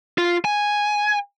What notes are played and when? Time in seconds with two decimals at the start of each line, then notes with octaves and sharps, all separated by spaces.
0.18 F4
0.45 G#5